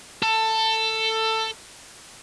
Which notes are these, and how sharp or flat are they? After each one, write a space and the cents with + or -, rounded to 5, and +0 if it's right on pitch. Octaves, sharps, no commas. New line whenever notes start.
A4 +15